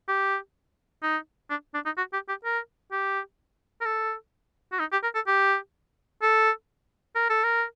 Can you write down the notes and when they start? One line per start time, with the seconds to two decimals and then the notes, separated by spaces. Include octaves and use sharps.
0.08 G4
1.03 D#4
1.50 D4
1.74 D4
1.85 D#4
1.97 F#4
2.13 G4
2.29 G4
2.45 A#4
2.92 G4
3.81 A#4
3.85 A4
4.72 F#4
4.80 D#4
4.92 G4
5.03 A#4
5.15 A4
5.27 G4
6.22 A4
7.15 A#4
7.30 A4
7.44 A#4